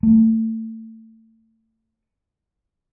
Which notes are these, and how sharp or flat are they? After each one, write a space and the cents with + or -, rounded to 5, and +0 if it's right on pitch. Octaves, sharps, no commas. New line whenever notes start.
A3 +30